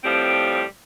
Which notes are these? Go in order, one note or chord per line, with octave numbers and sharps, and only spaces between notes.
A2 F3 G3 C4